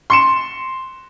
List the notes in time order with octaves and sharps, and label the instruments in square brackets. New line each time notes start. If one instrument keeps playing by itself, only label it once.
[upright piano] C6 C#7 E7